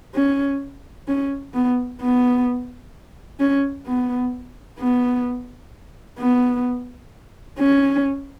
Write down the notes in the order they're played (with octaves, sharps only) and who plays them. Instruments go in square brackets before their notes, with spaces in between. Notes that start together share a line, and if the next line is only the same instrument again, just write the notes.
[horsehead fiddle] C#4
C#4
B3
B3
C#4
B3
B3
B3
C#4